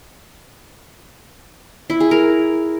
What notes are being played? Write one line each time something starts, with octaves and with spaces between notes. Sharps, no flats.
E4
G#4
A#4